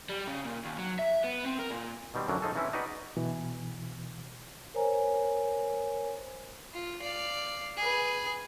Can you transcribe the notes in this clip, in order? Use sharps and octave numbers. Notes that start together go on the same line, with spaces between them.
G3
C#3
A#2
D#2
F#3
E5
B3
C4
A#4
A#2
B2 D#3 G3 C4
F#2 D3 F3 F#3
F3 D#4 G#4 A4
E3 C4 C#4 E4
D#4 F#4 G#4 B4 D5
B2 E3
A#4 C5 C#5 G#5 A#5
F4
D5 F5
G#4 B4